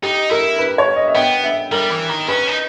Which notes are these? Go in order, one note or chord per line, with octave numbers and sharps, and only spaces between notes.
D#4 G4
E4 A#4
B4
C#5
D#5
E5
B3 G5
E5
G3 A#4
E3
D#3
C#4 B4
D#4